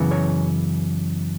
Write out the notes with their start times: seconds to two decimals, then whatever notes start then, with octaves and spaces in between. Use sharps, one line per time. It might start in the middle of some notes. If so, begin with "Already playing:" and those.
Already playing: F#2 C#3 E3 B3
0.11 C#5